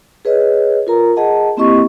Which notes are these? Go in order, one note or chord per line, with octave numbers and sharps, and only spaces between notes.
G#4 B4 C#5 D#5
F4 A#4 A#5
G#4 D#5 F#5 A5
A#3 C4 E4 G4 D#5 C#6